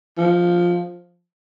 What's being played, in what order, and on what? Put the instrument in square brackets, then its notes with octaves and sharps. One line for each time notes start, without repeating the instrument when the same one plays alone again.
[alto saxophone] F3